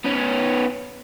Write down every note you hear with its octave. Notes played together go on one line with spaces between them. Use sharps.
B3 C#4